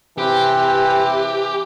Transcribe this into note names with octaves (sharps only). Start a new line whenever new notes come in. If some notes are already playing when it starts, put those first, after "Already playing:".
C3 E3 C4 G4 B4